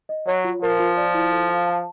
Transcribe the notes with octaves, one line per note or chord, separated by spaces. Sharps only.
D#5
F#3 C#5
F4
F3 A#4
F4
D5
E4
A4
F5
A5